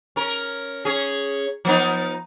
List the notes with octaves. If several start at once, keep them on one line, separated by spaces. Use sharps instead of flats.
C#4 A#4
C#4 G#4
F3 B3 D#4